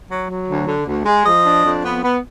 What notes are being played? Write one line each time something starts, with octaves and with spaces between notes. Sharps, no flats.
F#3
F#3
D2
D3
D2
G#3
F3 D#5
D4
F2
B3
B3